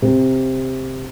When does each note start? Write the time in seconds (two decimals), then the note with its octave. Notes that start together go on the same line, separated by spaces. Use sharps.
0.02 C3